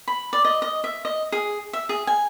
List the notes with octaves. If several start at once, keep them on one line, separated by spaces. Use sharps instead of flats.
B5
D5
D#5
D#5
E5
D#5
G#4
E5
G#4
G#5